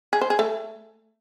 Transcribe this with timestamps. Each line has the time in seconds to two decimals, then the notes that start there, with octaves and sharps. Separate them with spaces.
0.13 G#4
0.21 C5
0.30 G#4
0.39 A3